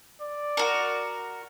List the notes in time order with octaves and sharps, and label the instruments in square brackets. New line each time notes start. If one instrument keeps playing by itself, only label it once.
[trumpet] D5
[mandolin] F#4 A#4